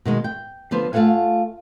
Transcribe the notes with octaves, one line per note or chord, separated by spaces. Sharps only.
B2 D#3 G#3
G5
D3 F3 B3 C5
A3 F4 A4 F5 F#5 G#5